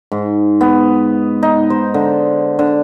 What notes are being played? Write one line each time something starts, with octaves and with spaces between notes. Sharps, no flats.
G#2
B3
D#4
C5
D3
D3